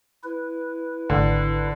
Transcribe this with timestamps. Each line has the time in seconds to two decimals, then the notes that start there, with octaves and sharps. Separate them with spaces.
0.24 E4 B4
1.10 G#1 D3